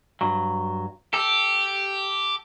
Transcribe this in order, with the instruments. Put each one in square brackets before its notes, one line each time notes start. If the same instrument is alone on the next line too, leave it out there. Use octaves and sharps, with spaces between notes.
[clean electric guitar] G2 F#3
[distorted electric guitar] G4 [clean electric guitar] A4